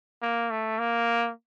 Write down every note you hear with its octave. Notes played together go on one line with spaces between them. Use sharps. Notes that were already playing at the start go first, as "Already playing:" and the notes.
A#3
A3
A#3